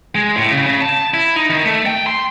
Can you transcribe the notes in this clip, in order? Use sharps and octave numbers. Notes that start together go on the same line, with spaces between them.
G#3
A2
C#3
C#3
A5
E4
D#4
D#3
A3
G5
C6